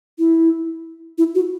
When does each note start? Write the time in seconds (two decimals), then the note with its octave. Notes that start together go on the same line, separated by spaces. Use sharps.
0.19 E4
1.18 E4
1.35 F#4